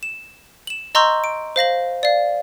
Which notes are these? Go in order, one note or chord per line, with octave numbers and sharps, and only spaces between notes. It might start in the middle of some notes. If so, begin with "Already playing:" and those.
E7
E7 F#7
D#5 A#5 C6 C#6 E6 G6
D7
C5 F5 A#6 F#7
D5 F5